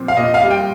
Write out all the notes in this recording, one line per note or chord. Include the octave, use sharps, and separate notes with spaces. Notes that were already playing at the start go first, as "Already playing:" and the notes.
Already playing: A#2 F3 C4
F5
A#2 D#5
F5
G3
G5